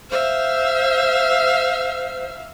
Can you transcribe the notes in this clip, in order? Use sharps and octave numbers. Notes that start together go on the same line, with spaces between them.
C5 E5 F5